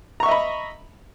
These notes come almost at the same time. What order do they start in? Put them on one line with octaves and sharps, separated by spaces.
A#5 C#6 E5 D#5 B5